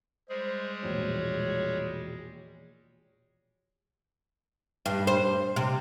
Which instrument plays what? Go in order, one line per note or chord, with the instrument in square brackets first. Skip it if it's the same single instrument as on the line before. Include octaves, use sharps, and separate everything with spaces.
[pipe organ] G3 G#3 G#4 [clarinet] C5
[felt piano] E1 A#1 A#2 [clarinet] C#5
[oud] G2
C5
C3